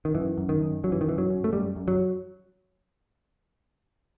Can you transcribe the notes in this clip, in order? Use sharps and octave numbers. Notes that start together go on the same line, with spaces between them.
D#3
F#2 E3
F#2
D#3
F#2
F#2 F#3
E3
D#3
F#2 E3
F#3
F#2
A3
F#2 G3
F#2
F#3